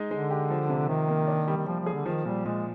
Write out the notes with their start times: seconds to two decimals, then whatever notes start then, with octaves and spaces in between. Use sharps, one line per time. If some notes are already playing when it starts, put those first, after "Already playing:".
Already playing: G#3 D#4
0.10 D3 G#3
0.31 G4
0.50 F3
0.70 C3
0.88 C3 D#3
1.08 A#3
1.27 D4
1.48 G3
1.57 D#3
1.67 F3 G3
1.80 F3
1.86 G#4
1.93 D3
2.06 D#3 F3
2.25 A#2 G3
2.45 A#2 G#3